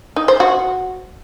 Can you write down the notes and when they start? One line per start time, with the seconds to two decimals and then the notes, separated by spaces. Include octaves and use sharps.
0.16 D#4
0.28 C5
0.40 F#4